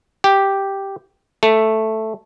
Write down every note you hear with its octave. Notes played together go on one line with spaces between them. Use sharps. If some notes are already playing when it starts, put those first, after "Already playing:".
G4
A3